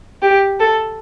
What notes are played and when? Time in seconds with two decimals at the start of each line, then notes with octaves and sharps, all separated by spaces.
0.22 G4
0.59 A4